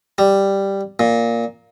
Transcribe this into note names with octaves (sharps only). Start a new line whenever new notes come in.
G3
A#2